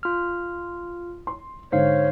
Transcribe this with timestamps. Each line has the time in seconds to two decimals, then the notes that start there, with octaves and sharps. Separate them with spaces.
0.03 F4 F6
1.27 C6
1.72 G#2 D3 C5 C#5 F5